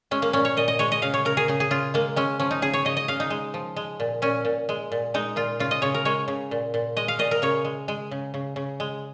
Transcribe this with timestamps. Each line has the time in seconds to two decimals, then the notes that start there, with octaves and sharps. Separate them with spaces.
0.11 G#3 C#4
0.22 A#3
0.33 A#2 C#4
0.45 C#5
0.57 A#2 D#5
0.68 D#5
0.79 G#3 C#5
0.92 D#5
1.02 C#3 F5
1.14 C#5
1.25 C#3 A#4
1.37 G#4
1.48 C#3 G#4
1.60 G#4
1.71 C#3 F4
1.94 G#3 A#3
2.16 G#3 C#4
2.40 F3 C#4
2.51 D#4
2.62 C#3 G#4
2.73 C#5
2.85 C#3 D#5
2.97 D#5
3.08 C#3 F5
3.20 D#4
3.30 G#3
3.54 F3
3.76 G#3
4.00 A#2
4.22 A#2 C#4
4.45 A#2
4.69 G#3
4.92 A#2
5.14 G#3 D#4
5.36 A#2 F4
5.60 C#3 F4
5.71 D#5
5.82 C#3 C#5
5.94 A#4
6.05 G#3 C#5
6.28 C#3
6.51 A#2
6.74 A#2
6.97 G#3 D#5
7.08 F5
7.19 A#2 D#5
7.31 A#4
7.42 C#3 C#5
7.65 G#3
7.88 G#3
8.11 C#3
8.34 C#3
8.56 C#3
8.80 G#3